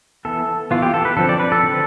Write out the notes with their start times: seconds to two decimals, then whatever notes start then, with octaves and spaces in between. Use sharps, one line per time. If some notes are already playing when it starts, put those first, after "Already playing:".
0.25 E3 B3 A4
0.71 E3 B3 F4
0.82 G4
0.94 A4
1.05 B4
1.17 D3 F3 C4 A4
1.29 D5
1.40 B4
1.52 A4
1.63 D3 F3 C4